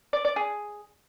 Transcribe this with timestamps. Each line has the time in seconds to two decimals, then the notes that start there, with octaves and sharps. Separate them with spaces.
0.13 D5
0.25 D5
0.36 G#4